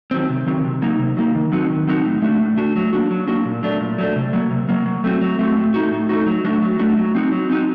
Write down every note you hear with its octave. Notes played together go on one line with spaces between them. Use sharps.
D#3 F#3 C4
C3
D#3 F#3 C4
C3
F#3 A#3 D#4
C3
F#3 A#3 D#4
D#3
F#3 C4 D#4 F#4
D#3
F#3 C4 D#4 F#4
A2
A3 D4 F#4
A2
A3 D4 F#4
F#3
A#3 D4 F#4
F#3
A#3 D4 F#4
A#2
F#3 A3 D4
A#2
F#3 A3 D4
C3
F#3 A#3
C3
F#3 A#3
F#3
A3 C4 F#4
F#3
A3 C4 F#4
A2
A3 D#4 F#4
A2
A3 D#4 F#4
F#3
A3 D4 F#4
F#3
A3 D4 F#4
F#3
C4 D#4 F#4
F#3
C4 D#4 F#4